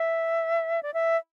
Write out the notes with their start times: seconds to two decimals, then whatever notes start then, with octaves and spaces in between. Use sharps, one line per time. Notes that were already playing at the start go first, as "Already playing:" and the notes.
Already playing: E5
0.83 D5
0.94 E5